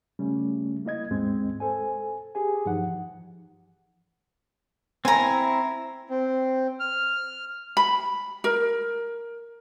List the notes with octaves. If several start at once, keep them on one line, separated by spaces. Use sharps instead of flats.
C#3 G3 A3 C#4
A#3 E4 D#5 G#6
D#2 G#2 G#3 C4
A4 C5 G#5
G4 G#4 G#5
G2 E3 F3 D#4 F#5
C4 E4 G#5 A#5
C4
F6
B5
A#4